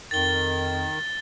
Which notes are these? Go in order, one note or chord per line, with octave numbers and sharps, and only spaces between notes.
F2 D#3 A6 G7